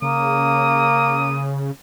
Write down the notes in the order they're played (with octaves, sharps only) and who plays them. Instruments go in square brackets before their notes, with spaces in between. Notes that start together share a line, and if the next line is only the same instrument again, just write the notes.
[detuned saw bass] C#3 [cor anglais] A#3 [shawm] D#6